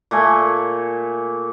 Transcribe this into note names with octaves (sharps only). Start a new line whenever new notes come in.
A#2 A3 G#5